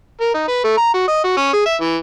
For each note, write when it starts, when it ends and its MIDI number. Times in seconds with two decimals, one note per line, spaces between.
0.21 0.33 70
0.34 0.47 63
0.48 0.61 71
0.64 0.73 57
0.77 0.90 82
0.94 1.05 66
1.08 1.22 75
1.24 1.32 66
1.37 1.49 61
1.53 1.61 68
1.66 1.75 76
1.81 1.97 52